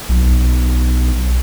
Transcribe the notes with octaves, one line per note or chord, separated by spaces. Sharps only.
B1